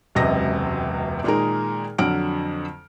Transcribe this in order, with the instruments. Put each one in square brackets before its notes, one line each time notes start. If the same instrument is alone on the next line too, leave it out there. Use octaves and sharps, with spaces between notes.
[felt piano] E1 C#2 F#2 C3 D#5 A#6
A#2 D#3 G#3 D#4 G#4 A#4
F2 D3 F#3 F#5 F6 D7